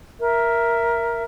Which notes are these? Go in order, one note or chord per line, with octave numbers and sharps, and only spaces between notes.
A#4 E5